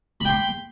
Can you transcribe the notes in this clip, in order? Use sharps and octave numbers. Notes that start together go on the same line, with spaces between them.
G5 B5 C6